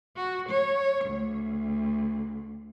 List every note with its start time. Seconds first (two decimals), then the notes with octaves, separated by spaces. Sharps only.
0.17 F#4
0.49 C#5
1.05 D2